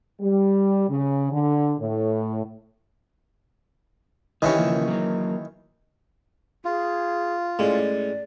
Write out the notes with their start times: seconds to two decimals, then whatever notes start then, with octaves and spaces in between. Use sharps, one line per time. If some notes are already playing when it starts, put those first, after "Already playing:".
0.21 G3
0.88 C#3
1.31 D3
1.80 A2
4.42 D#3 E3 C#4 D#4 G4
4.58 C#3 F3 A#3
4.87 F#3 A#3
6.65 F4 G#4
7.59 A2 G#3 C#4 D5